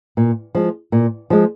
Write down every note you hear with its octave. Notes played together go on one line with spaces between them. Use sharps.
A#2
F3 G#3
A#2
F3 G#3